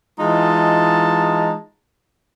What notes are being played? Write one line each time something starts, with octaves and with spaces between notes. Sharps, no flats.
E3 G#3 D#4 F4 A5